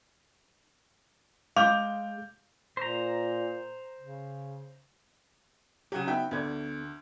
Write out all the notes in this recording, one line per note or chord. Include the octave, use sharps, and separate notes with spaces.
G#3 F5 D6 G6 F7
A#2 C5 A#5
C#3
C#3 F#3 G4 F#5
B3 D#4 F#4 E5 G5
D2 B3 A4 D5 G#6